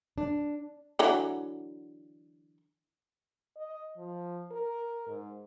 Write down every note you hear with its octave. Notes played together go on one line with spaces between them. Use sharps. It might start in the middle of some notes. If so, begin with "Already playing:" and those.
D4
D3 E3 F#3
D#5
F3
A#4
G#2